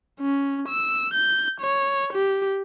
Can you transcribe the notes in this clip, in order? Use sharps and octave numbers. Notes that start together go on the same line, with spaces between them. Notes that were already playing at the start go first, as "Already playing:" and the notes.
C#4
E6
G6
C#5
G4